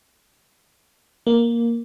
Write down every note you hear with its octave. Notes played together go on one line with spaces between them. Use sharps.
A#3